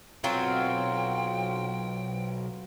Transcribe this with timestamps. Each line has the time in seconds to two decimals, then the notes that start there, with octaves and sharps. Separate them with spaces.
0.24 B1 F#3 C4 F4 G5